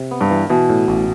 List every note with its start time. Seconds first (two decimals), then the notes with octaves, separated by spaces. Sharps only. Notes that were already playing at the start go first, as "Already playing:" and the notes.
Already playing: C3
0.11 B3
0.21 G2
0.31 E3
0.50 B2 E3
0.69 A2
0.88 A1